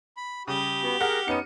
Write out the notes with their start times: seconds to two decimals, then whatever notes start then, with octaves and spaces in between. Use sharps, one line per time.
0.17 B5
0.48 C#3 G3 G4 D#6
0.83 B3 F#4
1.01 G#4 A#4 F#5 A#5 F6 A#6
1.28 B3 C#4 D#4 C#7 D#7